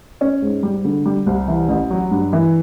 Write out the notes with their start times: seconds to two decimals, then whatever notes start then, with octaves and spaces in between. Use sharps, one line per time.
0.21 C#4
0.42 G#2
0.63 G3
0.85 D3
1.06 G3
1.26 C2
1.48 E3
1.69 A1
1.91 F#3
2.11 G2
2.33 E3